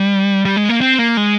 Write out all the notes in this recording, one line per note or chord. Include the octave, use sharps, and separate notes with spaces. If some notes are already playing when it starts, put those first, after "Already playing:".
Already playing: G3
G3
G#3
A#3
C4
A#3
G#3